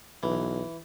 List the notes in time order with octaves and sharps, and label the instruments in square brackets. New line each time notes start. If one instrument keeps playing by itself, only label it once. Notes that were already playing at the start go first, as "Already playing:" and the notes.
[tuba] B1 [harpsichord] E3